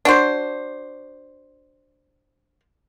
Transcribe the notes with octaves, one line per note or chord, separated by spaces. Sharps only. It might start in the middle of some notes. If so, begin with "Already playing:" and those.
D4 F#4 C5